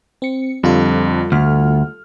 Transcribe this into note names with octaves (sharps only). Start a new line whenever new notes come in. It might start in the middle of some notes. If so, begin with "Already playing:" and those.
C4 C#7
F2 D3 G3 F4 A4
D2 F6